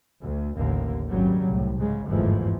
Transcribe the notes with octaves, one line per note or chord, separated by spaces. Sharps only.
D2
A1 D#2 D3 A#3
G#1 G2 C#3 F#3 G3
C2 A2
G#2 C#3 G#3
G1 E2 G#2 E3 F3 A3